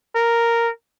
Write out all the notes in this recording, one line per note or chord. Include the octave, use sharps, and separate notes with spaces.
A#4